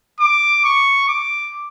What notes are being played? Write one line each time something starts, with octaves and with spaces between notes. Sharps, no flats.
D6
C#6
D6